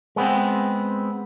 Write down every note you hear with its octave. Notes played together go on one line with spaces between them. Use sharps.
G#3 B3 C4